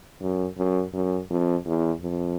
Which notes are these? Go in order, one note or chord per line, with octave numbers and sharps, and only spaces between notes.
F#2
F#2
F#2
F2
E2
F2